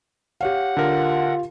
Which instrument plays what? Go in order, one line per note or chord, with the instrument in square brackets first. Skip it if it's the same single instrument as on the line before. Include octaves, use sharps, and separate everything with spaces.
[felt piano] G4 C#5 F5 [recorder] F#5
[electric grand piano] D3 A#4 [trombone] F4